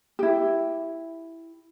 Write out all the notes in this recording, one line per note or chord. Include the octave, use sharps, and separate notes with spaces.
E4 G4